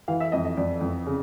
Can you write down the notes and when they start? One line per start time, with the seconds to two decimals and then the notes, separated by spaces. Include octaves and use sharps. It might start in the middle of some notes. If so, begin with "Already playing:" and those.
0.08 E3 F5
0.20 E5
0.32 F2 D#5
0.45 D#5
0.57 F2 D5
0.81 F2
1.07 C#3